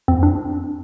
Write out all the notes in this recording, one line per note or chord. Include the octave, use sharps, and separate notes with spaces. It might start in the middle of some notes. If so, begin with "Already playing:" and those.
F2 C4
D4